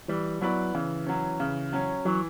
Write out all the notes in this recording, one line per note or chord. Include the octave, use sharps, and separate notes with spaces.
E3 G3
F#3 B3 E4 B4 D5
C#3 E3
F#3 C#4
C#3
F#3 C#4
E3 F#3